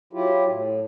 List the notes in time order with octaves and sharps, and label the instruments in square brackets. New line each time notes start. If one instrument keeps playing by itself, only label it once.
[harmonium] F#3 E4 F4 G4
A2